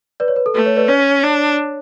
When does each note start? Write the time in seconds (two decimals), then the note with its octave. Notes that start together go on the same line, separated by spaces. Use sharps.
0.20 B4 D5
0.28 C#5
0.36 B4
0.46 A4
0.54 A3 B4
0.66 C#5
0.76 B4 D5
0.88 C#4 C#5
1.23 D4